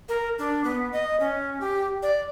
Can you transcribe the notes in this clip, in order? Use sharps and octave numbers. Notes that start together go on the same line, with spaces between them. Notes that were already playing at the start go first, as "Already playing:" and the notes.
A#4
D4
B3
D#5
C#4
G4
D5